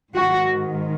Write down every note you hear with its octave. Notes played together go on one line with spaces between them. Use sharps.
G#2 D#3 F#4